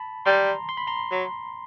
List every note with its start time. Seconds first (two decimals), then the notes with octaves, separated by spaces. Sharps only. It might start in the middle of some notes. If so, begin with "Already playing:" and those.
Already playing: A5 B5
0.26 G3 A#5 C6
0.69 C6
0.77 B5
0.87 A#5 C6
1.11 F#3